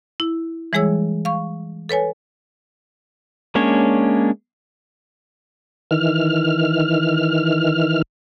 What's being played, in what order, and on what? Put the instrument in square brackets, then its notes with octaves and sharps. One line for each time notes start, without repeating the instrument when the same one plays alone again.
[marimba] E4
E3 G3 G#3 G#4 C#5 E6
F5 C#6
A4 B4 C#5 G#5
[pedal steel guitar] G#3 A#3 C#4 D4 C#5
[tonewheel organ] D#3 E3 F6